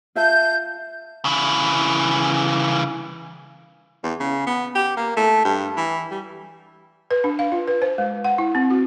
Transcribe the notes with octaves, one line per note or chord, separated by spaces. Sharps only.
F4 E5 A5 G6
C#3 E3
E2
C#3
B3
G4
A#3
A3
G2
E3
G3
B4
D4
F5
F4
B4
C5
G#3
F#5
E4
C4
F#4